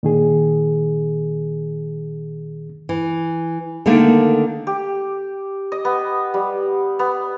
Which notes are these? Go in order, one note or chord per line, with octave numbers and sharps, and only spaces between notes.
A#2 D#3 G#4
E3
D3 D#3 A3 A#3
G4
D#5
B3
G3
B3